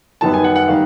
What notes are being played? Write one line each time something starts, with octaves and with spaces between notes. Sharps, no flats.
F#2 D#3 G3 B3 A5
G#5
F#5
F#5
D#3 G3 F5